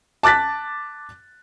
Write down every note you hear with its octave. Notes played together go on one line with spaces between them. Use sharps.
A5 D6 F#6 A6 B6